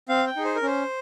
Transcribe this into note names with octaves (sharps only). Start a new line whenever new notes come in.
C4 F5
G5
D#4 G#4
C5
A#4
C#4 C5